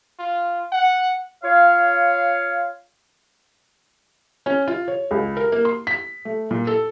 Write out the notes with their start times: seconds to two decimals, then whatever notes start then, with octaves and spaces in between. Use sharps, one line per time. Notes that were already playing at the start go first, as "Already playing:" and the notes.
0.19 F4
0.72 F#5
1.43 F4 C#5 F5
4.46 C#4
4.68 F4
4.88 C#5
5.11 C#2
5.37 A#4
5.52 A#3
5.65 C6
5.87 B6
6.25 A3
6.51 A#2
6.67 A4